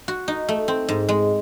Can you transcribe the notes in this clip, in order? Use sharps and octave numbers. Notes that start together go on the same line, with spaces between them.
F#4
D#4
A3
C4
G#2
G#3